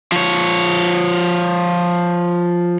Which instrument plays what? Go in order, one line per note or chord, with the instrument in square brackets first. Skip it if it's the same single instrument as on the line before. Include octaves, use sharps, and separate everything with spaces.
[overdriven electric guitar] F3 C#5